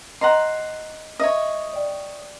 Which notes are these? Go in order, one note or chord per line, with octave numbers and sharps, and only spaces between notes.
D#5 F#5 A#5 C6
C#5 D#5 E5
D5 G5